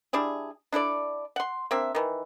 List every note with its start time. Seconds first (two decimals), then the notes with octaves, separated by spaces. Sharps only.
0.13 G3 D4 E4 G#4
0.72 D4 E4 A4 D5
1.36 F#5 C6
1.71 A#3 C4 D4 E5
1.95 D#3 E3